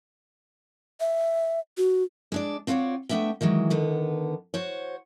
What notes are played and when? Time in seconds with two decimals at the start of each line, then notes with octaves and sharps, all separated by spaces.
1.00 E5
1.77 F#4
2.32 G#3 D4 D5
2.67 C4 F4 F#4 B4 C#5 D5
3.09 A3 B3 D4 E5 G5
3.41 D#3 E3 F#3 G#3
3.70 D3 D#3 B3
4.54 F#4 C5 C#5